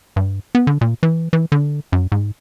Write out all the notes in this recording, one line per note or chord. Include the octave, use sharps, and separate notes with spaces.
G2
B3
D3
A#2
E3
E3
D3
F#2
G#2